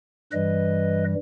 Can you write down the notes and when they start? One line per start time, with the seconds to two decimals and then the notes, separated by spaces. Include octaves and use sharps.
0.32 G2 E3 G3 B4 D#5